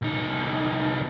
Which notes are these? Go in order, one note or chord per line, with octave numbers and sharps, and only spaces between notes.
C2 D#4